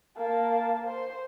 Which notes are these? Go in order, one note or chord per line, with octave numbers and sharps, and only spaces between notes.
A#3 A5
C5